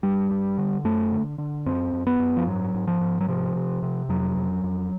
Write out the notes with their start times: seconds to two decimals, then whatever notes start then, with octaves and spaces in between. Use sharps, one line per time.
0.03 G2 G3
0.31 G2
0.58 D3
0.84 F#2 A3
1.12 D3
1.38 D3
1.66 F#2 C4
1.93 F#2
2.07 B3
2.19 F#2
2.37 F3
2.47 G#2 F#3
2.74 G#2
2.88 F3
3.01 G#2
3.20 F#3
3.28 C3 F3
3.56 C3
3.83 C3
4.09 F2 F#3
4.37 F2
4.64 F2